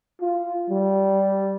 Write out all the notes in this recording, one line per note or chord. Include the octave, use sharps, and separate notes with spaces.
F4
G3